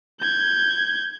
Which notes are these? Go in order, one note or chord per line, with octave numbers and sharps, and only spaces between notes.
G6 G#6